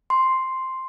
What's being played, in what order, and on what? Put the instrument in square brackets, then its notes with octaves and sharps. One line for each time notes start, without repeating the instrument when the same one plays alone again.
[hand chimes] C6